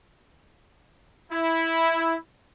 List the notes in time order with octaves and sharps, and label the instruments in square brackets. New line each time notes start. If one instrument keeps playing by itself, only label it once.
[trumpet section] E4